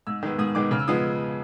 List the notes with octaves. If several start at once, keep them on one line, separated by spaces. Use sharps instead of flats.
G#2 E6
D#3 G#3 B3
G#2 D#6
D#3 G#3 B3 D6
C#3 F6
E6
F3 G#3 B3 D#6